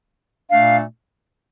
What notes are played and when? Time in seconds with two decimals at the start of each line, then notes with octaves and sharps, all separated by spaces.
0.50 A#2 A3 D4 F5